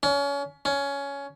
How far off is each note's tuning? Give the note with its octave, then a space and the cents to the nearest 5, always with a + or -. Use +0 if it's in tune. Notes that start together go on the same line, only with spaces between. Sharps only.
C#4 +30
C#4 +15